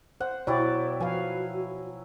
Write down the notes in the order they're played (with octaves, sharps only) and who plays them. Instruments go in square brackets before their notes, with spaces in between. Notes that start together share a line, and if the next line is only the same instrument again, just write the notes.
[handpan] C5 [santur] F#5
[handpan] B2 D5 [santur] F#3 E4 G4 [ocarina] C5
[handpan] F3 B4 F5 [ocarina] F#4 [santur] G#5